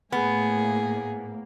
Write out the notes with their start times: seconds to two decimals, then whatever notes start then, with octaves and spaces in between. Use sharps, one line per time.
0.12 A2 A#3 B3 G#4